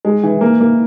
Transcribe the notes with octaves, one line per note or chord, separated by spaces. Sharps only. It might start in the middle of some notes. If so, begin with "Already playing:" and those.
G#3
E3
A#3
A#3